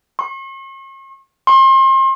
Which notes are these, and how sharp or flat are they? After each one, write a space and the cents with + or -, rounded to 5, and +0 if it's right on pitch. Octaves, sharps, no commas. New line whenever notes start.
C#6 -45
C6 +35